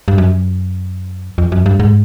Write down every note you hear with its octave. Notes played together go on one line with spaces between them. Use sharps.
G2
F#2
F2
F#2
G2
G#2